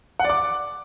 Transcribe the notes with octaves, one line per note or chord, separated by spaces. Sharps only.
F#5
D5
D6